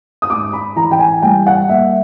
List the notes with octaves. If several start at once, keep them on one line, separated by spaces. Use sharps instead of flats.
D#6
G#2 D6
B5
E3 A#5
G5
G#5
G3 G5
F#5
A#3 E5